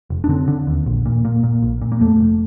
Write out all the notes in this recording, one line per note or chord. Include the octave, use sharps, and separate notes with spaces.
F1
D4
D3 C4
D3
D#2
A#1
A#2
A#2
A#2
A#1
A#2
A#3
F2 A3
F1